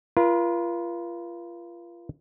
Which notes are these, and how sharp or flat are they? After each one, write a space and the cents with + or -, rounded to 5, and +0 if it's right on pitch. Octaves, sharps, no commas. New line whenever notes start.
F4 -25 A#4 +45